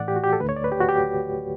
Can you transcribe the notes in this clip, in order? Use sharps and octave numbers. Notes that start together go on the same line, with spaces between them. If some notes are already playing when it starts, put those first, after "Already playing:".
Already playing: A2 E3 A3 D5 F#5
G4
F#4
G4
A4
D2 D3 A3 B4
C#5
D5
B4
G4
F#4
G4